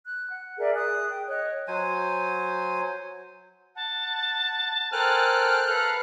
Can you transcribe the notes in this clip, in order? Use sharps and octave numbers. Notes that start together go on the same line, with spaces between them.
F#6
F#5
G#4 A#4 D5 E5
G#4 D#6 F#6
G5
C#5 D#5 F#6
F#3 C5 G#5
F#5 A5
A4 A#4 C5 G5 G#5 F6 F#6
A4 B4 F5 A#5